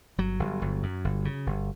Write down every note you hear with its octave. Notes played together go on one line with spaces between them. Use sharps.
G1 F#3
G1
G1
F#2
G1
C#3
G1